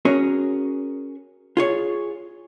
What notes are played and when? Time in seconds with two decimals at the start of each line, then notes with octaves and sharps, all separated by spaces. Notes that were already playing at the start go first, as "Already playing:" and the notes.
0.05 C#4 F#4 G#4 A#4 C#5
1.57 F4 G#4 C#5